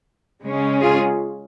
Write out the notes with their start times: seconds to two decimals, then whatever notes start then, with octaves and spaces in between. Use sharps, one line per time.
0.43 C#3 G#3 C#4
0.82 F4 G#4